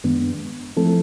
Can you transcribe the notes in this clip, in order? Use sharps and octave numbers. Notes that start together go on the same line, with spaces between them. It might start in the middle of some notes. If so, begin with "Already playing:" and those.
F#2 D#3 G#3 B3 D4
F3 A3 C4 E4 A4